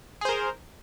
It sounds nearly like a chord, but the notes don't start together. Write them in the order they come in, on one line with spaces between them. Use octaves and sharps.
G#4 C5 A#4